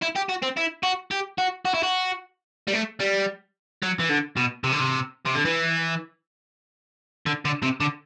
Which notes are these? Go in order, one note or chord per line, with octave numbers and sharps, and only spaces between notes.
E4
G4
F#4
C4
E4
F#4
G4
F#4
F#4
E4
F#4
G3
A3
G3
F#3
E3
D3
B2
C3
D3
C3
C3
D3
E3
D3
D3
C3
D3